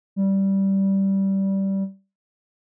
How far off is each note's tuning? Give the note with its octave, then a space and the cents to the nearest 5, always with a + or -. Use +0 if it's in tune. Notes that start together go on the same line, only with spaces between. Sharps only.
G3 -15